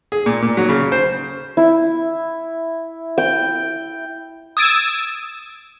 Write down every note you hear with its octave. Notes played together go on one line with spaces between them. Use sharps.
G#4
A#2
A#2
F#3
C#3
C5
E4
G5
D#6 E6 G#6 A6 D7